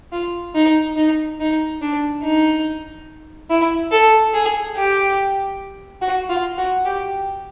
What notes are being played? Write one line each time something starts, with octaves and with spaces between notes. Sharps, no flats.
F4
D#4
D#4
D#4
D4
D#4
E4
A4
G#4
G4
F#4
F4
F#4
G4